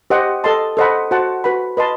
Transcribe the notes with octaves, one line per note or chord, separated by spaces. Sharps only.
G4 C5 D#5 F#5
A4 D#5 A5 C6
A4 C5 D#5 F#5 B5
F#4 C5 F#5 A5
F#4 B4 F#5 B5
B4 D#5 A5 C6